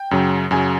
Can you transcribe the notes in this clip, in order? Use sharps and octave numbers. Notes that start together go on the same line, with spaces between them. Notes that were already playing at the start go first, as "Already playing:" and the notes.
Already playing: G5
F#2 C#3 F#3
F#2 C#3 F#3 G#5